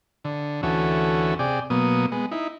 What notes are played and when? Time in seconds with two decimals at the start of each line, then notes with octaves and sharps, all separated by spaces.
0.25 D3
0.63 D2 E3 C#4 F#4 A4
1.39 C3 G#4 D5 G5
1.70 B2 F#3 A#3 B3 D#6
2.12 G#3 B3
2.31 D#4 E4